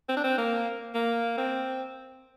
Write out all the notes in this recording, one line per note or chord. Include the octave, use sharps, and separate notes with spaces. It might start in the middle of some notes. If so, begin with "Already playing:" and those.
C4
D4
C4
A#3
A#3
C4